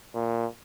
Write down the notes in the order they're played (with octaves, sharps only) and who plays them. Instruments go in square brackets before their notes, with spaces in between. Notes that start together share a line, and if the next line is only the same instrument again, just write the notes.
[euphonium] A#2